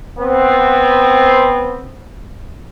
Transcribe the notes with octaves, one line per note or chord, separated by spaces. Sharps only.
B3 C4